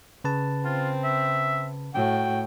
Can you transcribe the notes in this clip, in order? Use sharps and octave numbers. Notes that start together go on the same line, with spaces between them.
C#3 B4 A5
C4 F4
E5
A2 F#4 G5